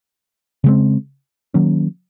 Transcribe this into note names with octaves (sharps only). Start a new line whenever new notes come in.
C#3 G#3 C4
D#3 F#3 A#3 C#4